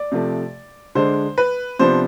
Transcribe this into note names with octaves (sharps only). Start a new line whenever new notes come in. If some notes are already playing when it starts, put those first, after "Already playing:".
Already playing: D5
C3 F3 A3
D3 G#3 D4 C5
B4
C3 F3 B3 D4 C5